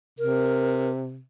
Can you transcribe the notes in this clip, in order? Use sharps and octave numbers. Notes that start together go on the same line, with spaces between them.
C3 A#4